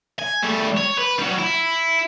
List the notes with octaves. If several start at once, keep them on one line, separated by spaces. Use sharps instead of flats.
G#5
G3 A3
C#5
B4
F#3 G3
E4